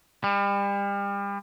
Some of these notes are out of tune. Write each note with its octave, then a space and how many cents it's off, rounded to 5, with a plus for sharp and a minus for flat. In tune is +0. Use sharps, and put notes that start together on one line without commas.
G3 +35